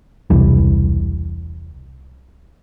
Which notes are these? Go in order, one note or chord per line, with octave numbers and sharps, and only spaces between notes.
E1 C2 E3 G3